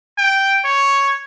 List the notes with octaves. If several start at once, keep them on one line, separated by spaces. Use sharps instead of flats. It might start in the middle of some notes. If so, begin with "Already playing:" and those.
G5
C#5